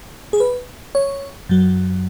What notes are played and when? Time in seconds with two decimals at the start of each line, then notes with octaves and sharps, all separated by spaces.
0.33 G#4
0.40 B4
0.95 C#5
1.49 F#2 F#3